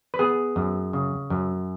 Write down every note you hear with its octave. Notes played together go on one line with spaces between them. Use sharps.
B4
B3 G#4
F#2
C#3
F#2